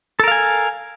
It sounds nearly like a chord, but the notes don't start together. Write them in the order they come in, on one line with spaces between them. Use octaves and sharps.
A4 A#4 F5 G#5